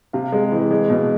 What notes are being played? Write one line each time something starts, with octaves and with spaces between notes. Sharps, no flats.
C3 F5
G#3
E3
G#3
B2